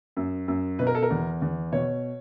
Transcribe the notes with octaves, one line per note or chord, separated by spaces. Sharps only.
F#2
F#2
B2 B4
A#4
A4
A#4
E2
E2
B2 C#5